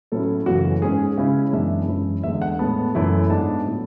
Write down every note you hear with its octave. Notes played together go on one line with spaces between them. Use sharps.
A2 F#3 A3 C#4 E4 A4
F#2 C#3 E3 A3 F#4
G#2 G#3 C#4 G#4
C#3 G#3 C#4 E4
F#2 E3 G#3 B3 D4 E5
F#2 E3 G#3 C#4 E4
E2 D3 G#3 E5
F#5
A2 G#3 B3 A5
F#2 E3 A3 E4
G#2 G#3 B3 D4 A5
A2 F#3 B3 E4